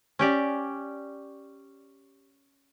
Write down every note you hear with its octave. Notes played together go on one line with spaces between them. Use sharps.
C#4 G4 D5